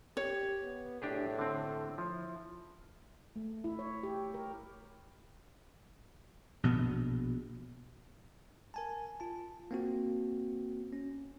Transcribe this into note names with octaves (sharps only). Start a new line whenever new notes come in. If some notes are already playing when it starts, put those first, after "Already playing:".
G4 C#5
B3
A2 D4 G4 G#4
D3 C4
F3 E4
A3
E4
C#5
G4
A#4
A#1 B2 B3
A#4 G#5 A5
F4 A5
A#3 C4 F#4
C#4